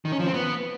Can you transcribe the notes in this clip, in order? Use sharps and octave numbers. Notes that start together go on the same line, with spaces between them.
D#3
C#4
F3
C4
B3